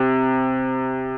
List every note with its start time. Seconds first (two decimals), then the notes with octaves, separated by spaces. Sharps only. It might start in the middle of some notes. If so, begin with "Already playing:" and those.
Already playing: C3